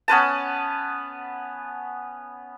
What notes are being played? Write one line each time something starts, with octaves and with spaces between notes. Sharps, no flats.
B3 C#4 B4 A5